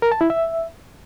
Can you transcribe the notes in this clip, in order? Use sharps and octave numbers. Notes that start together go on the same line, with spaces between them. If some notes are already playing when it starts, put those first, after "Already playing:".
A#4
A5
E4
E5